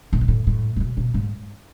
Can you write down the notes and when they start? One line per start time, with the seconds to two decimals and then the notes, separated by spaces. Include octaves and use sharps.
0.13 A2
0.21 B2
0.28 A2
0.47 A2
0.76 A2
0.80 B2
0.97 B2
1.14 G#2